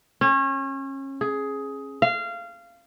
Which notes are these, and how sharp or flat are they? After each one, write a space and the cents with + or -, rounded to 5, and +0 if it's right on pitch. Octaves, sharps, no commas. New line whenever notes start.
C#4 -30
G#4 +10
F5 -20